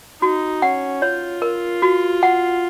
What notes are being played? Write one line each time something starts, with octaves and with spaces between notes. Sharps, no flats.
D#4 F#4
C#4 F#5
F4 C#5
A#4
F#4
F#5